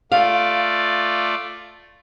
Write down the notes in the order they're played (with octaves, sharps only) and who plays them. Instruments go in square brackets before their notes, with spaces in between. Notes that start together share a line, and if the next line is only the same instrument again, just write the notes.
[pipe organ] A3 F4 D5 [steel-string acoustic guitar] F5